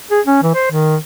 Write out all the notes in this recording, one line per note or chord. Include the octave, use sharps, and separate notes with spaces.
G#4
C#4
E3
C5
D#3